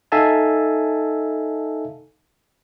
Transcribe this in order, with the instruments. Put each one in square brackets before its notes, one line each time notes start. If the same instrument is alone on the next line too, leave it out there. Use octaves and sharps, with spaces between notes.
[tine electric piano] D#4 A4 E5 F5 G#5 A5